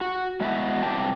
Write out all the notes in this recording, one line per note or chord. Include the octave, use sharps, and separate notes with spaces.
F#4
G#3 B3 E4 F#4 E5
C3 E3 G3 G4 G5 A5